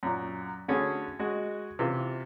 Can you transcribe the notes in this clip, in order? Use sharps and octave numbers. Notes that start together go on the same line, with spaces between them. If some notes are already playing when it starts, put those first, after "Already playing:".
F#2 A#2
D3 A3 C#4 F#4 G#4
G#3 F#4 D#5
C3 E3 F4